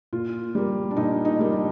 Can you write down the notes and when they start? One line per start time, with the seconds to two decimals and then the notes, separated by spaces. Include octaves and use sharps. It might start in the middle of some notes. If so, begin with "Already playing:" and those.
0.13 A#2 F4
0.55 G3 A#3
0.91 D4
0.97 A#2 D#4
1.25 D#4
1.39 G3 A#3
1.52 D4